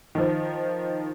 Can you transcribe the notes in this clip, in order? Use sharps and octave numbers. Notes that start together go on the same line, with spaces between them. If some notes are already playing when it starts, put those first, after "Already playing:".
D#3 F3